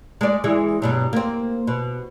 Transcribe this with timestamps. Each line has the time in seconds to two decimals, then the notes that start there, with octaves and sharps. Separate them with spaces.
0.21 G#3 D5
0.44 E3 G#3 G#4
0.82 G2 B2 F#3
1.13 A#3 C4
1.67 B2